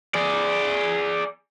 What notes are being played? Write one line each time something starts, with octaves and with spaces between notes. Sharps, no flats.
G#4 D5